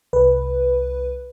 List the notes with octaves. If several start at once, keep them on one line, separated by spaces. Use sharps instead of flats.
C2 B4